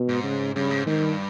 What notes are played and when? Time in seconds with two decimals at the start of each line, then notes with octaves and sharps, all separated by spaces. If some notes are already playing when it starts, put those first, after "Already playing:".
Already playing: B2
0.09 G#2
0.24 C#3
0.55 G2 C#3
0.70 G#2
0.86 G#2 D#3
1.01 G2